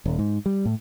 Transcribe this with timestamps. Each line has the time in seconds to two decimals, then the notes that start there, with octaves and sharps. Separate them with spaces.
0.06 D#1
0.19 G#2
0.46 G3
0.65 A2